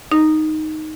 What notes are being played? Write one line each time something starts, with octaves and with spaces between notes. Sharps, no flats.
D#4